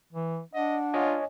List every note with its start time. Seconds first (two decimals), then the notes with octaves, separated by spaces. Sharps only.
0.13 E3
0.54 D4 D#5 F#5
0.94 F4 C#5 D#5 G#5